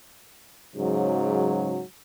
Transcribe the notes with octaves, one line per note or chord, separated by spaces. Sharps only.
G#2 C#3 F#3